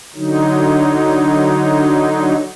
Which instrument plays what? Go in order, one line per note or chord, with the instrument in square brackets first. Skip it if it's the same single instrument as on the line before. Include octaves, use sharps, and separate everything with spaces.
[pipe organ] D3 F#3 D#4